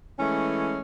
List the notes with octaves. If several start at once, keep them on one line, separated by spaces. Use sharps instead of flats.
E3 G#3 A3 C#4